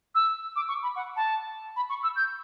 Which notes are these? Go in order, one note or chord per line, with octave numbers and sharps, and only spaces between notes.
E6
D6
C#6
B5
F#5
A5
B5
C#6
E6
G6